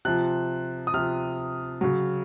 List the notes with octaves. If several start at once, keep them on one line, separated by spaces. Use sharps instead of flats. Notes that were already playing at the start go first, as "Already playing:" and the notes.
C3 F3 F#6
D#6
C3 F3 F6
C#3 F#3